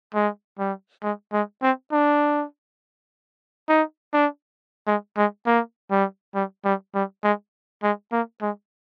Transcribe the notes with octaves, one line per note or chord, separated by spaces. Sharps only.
G#3
G3
G#3
G#3
C4
D4
D#4
D4
G#3
G#3
A#3
G3
G3
G3
G3
G#3
G#3
A#3
G#3